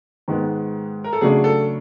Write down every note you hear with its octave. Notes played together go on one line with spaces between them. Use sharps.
G#2 D#3 G#3 B3
A#4
A4
C#3 F#3 A3 D4 G#4
A4